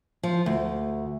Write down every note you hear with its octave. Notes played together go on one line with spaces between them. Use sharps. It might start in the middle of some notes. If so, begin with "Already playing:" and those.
F3
D2